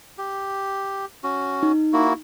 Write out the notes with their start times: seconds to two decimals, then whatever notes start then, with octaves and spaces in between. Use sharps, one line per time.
0.18 G4
1.23 C#4 F#4
1.63 D#4
1.93 A#3 E4 F#4